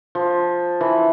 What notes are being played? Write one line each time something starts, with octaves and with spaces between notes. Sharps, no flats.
F3
E3